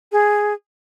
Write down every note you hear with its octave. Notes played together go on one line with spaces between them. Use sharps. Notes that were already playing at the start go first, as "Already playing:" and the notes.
G#4